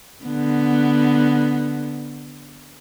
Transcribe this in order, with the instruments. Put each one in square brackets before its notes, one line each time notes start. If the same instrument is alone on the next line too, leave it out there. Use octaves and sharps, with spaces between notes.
[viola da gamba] D3 B3